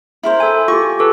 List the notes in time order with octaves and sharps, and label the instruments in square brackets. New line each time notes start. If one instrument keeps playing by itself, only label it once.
[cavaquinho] E4 A#4 C5
[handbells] A4 G#5
[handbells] F4 G4 [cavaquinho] C#6
[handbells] G4 A4 B4